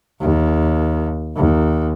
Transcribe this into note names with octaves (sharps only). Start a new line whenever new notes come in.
D#2
D#2